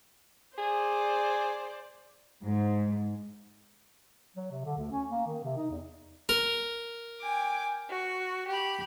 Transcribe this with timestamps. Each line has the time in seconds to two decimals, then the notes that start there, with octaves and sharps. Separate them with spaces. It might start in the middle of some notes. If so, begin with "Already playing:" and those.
0.58 G#4 C5 D5
2.44 G#2
4.37 F#3
4.51 C3
4.65 D3
4.78 D2
4.91 C#4
5.09 A#3
5.27 D#3
5.44 C3
5.57 D#4
5.71 E2
6.29 A#4
7.21 G5 G#5 D6
7.90 F#4
8.48 G4 B5